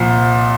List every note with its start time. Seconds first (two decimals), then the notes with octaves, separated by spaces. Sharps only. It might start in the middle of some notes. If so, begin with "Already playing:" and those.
Already playing: C2 A#2 F3